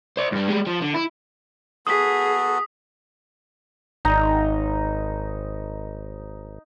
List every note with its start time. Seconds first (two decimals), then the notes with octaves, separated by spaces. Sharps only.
0.17 C5 D5
0.32 G2 G3
0.48 G3 G#3
0.66 F3
0.82 D3
0.95 E4
1.87 B3 F#4 G#4 A4 D#6 B6
4.05 G#1 D#4 A#5